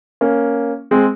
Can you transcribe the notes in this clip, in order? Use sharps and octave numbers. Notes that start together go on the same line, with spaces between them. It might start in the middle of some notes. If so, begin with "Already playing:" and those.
A#3 C#4
G#3 C4